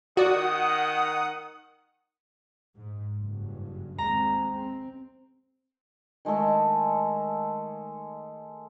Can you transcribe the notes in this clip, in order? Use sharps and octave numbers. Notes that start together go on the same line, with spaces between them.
D#3 F#4 D5 F#5 D#6
G#2
F#1 G2
D#2 G#3 C4 A#5
C4
D#3 G#3 A3 A4